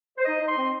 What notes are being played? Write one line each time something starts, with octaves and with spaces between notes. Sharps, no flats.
C5
D#4 D#5
D#4
C6
C4